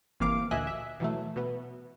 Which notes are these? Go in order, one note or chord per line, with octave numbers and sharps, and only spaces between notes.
G1 C3 E3 A#3 F5 D6
D2 A#2 D#5 E5 G#5 F#6
E5
B2 E3 F#3 A3
B2 B3